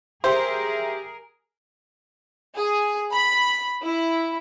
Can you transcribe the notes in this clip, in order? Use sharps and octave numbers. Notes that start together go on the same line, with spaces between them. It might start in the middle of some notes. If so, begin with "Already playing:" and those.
G4 G#4 A#4 C5 E5
G#4
B5
E4